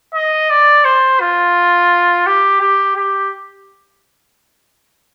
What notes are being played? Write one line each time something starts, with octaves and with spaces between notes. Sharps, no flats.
D#5
D5
C5
F4
G4
G4
G4